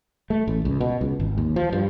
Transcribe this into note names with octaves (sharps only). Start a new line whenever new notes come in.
A3
A1
C#2
B2
C#2
G#1
D#2
F3
G2